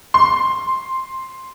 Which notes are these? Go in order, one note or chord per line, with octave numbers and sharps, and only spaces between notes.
C6